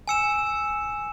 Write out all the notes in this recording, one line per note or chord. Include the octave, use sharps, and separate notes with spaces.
G#5 E6 C#7 E7